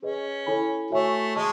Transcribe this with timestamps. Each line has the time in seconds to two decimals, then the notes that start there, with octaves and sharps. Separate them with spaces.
0.02 C#4 G#4 B4 D#5
0.46 E4 A4 C#5 G#5 B5
0.90 A3 F#4 C#5 E5 G#5 C#6
1.35 G#3 D#5 A5 C#6